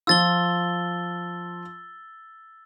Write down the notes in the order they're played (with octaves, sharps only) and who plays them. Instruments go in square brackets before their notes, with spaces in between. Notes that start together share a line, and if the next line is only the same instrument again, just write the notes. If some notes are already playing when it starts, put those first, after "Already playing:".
[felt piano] F3 F4 [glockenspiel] E6 A6 G7